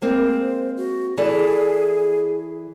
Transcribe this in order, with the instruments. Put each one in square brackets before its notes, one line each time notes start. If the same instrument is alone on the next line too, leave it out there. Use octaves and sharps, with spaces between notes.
[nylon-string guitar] G#3 A#3 C4 [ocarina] C5
[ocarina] F#4
[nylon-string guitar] E3 A4 D5 [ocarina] G#4